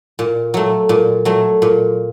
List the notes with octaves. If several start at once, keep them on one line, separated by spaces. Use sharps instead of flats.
A#2
F#3 A3
A#2
F#3 A3
A#2